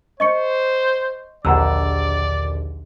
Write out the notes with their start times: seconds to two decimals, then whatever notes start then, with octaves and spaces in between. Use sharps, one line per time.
0.20 C5 D#5 C#6 C#7
1.45 A#1 D#2 D3 D5 F#5 A#5 E6